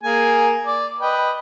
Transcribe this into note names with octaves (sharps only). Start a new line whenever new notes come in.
A#3 G#4 G#5
D5
B4 D#5 G5